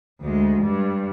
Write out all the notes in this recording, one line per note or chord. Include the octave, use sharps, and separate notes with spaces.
D2 G#3
G2